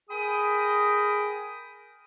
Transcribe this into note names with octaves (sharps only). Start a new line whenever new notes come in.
G#4 A#4 G5 B5 D#6